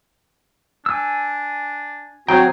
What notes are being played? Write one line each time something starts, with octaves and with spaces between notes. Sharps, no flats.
D4 G#5 E6
F#3 C4 F#4 G#4 G5 A#5 G6